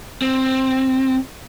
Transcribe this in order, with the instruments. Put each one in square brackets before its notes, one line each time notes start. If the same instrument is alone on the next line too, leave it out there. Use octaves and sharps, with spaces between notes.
[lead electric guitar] C4